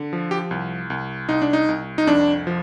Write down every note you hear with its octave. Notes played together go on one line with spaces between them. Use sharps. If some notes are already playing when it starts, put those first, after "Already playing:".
Already playing: D3
F3
G4
C2
C2
C2 D#4
D4
D#4
C2
D#4
F2 D4
F3